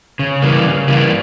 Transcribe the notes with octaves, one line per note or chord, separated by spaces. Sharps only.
C#3
E3 G3 A#3
C#3
E3 G3 A#3